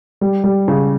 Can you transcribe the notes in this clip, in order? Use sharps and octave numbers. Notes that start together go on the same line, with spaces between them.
G3
G3
C#3